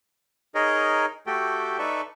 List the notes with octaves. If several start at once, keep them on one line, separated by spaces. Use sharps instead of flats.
D#4 G#4 A#4 C#5 D#5
A3 F#4 G4 A4 G5
D#4 A4 B4 D5 E5 C#6